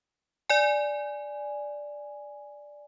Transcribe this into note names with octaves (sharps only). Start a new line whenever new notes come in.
D5 G#5